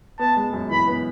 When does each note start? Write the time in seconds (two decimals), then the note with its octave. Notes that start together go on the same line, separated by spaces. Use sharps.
0.19 B3 A5
0.37 G#3
0.53 F#2
0.70 E3 B5
0.87 B3